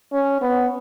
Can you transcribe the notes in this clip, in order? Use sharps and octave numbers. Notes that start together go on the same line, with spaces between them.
C#4
B3